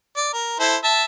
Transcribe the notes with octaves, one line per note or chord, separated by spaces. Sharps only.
D5
A#4
E4 A4 C5
E5 A5